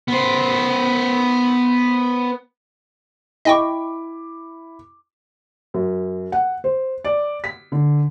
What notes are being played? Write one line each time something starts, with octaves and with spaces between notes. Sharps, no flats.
B3 C5
E4 D#5 G5 C#6 D6
F#2
F#5
C5
D5
B6
D3